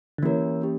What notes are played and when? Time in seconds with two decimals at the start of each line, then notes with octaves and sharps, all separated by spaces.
0.18 D3
0.23 E3 A#3 C#4 G4 A#4 C#5
0.61 A#3 C#4 G4